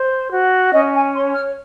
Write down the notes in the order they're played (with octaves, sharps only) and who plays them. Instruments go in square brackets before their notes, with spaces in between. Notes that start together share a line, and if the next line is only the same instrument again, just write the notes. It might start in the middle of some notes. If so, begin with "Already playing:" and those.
Already playing: [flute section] C5
F#4
C#4 D#5
G#5
C#5 C6
F6